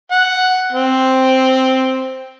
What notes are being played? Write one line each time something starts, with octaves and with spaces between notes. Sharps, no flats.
F#5
C4